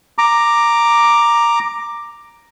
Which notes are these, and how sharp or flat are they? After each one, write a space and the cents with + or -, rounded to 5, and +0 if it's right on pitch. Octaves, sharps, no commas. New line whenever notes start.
A#5 +0 D6 +10